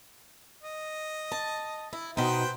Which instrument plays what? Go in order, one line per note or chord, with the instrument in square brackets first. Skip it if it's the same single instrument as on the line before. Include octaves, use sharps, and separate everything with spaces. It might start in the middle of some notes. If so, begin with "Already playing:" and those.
[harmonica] D#5
[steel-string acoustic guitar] A5
E4
[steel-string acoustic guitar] B2 D#4 [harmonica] B4 C5 G5